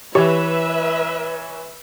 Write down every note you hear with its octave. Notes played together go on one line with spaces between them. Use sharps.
E3 G4 B4 C#5 E5